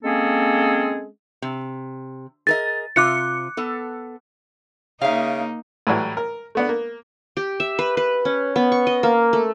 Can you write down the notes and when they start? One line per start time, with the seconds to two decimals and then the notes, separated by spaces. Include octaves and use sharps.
0.04 G#3 A#3 C4 C#4 G#4 A4
1.42 C3
2.47 G#4 A#4 D#5 A6
2.96 C3 F4 D6 F#6 C#7
3.57 B3 A4
5.01 C#3 A#3 D#4 E5 F5
5.87 A2 E3 F#3 G3
6.17 A#4
6.55 A3 B3 D4
6.69 A#3
7.37 G4
7.60 E5
7.79 B4
7.97 B4
8.25 C#4
8.56 B3
8.72 C#6
8.87 D#5
9.03 A#3
9.33 A3